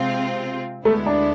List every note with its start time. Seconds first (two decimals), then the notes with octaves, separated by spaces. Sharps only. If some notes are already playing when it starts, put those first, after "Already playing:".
Already playing: C3 G#3 C4 F4
0.85 D2 D3 G#3 A3 B3 E4
1.06 D4